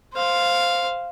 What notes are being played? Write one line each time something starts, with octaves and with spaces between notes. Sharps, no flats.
C5 F5